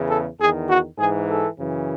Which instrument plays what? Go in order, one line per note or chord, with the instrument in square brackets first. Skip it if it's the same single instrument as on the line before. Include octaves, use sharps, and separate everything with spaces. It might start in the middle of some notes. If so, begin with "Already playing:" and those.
Already playing: [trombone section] E2 C#3 E3
A4
E2 D#3 G#4
F#4
G#2 E3 G#4
A4
F#2 C#3 E3